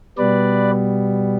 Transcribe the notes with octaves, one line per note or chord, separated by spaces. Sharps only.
B2 G3 B3 B4 D5